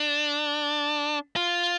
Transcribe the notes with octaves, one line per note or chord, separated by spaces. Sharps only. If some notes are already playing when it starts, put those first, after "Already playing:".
Already playing: D4
F4